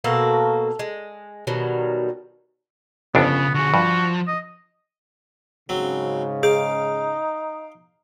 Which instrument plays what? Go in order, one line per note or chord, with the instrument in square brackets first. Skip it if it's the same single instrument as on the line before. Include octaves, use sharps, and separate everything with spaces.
[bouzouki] B2 A#3 F#4 A4
G#3
B2 D#3 F#3 G3
[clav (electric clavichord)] G1 F2 D4 [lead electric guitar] C#3 [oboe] B3
[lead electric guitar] D3 G#4 [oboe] F#4
[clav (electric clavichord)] G2 [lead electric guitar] F3
[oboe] D#5
[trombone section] G#2 C#3 [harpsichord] F#3 C4
[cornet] D#4 [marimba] G#4 [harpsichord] F5 D6